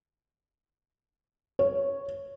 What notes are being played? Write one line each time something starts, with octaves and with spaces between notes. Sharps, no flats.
C#5